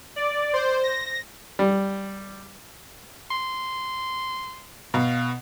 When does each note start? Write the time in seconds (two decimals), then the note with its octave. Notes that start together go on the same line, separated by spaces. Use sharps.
0.16 D5
0.53 C5
0.83 A#6
1.59 G3
3.31 C6
4.94 B2 F5